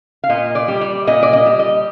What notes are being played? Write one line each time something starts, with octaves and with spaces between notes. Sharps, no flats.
F5
A#2 D#5
D5
G3
D5
A#2 D#5
D5
D#5
G3
D#5